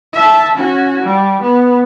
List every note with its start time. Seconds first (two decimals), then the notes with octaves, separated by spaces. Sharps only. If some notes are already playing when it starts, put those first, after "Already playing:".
0.13 E5 A5
0.55 C#4 F#4
1.03 G3
1.42 B3